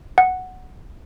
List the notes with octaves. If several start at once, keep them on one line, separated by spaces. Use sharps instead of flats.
F#5